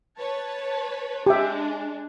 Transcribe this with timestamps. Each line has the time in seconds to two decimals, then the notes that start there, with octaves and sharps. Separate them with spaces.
0.19 B4 C#5 A5
1.26 G#3 D4 G4 E5